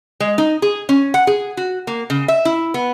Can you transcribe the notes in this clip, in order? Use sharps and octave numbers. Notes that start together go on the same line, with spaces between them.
G#3
D#4
G#4
C#4
F#5
G#4
F#4
A#3
C#3
E5
E4
B3